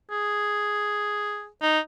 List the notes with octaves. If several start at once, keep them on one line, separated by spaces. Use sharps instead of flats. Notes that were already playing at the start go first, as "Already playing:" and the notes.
G#4
D#4